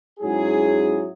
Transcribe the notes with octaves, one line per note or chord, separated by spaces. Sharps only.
G#2 F#3 C#4 E4 G#4